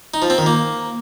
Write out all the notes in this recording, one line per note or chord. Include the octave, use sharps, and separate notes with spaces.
D#4
F3
C4
D#3
A#3